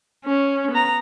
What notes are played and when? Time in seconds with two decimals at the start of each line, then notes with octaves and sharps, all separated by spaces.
0.25 C#4
0.71 B3 A#5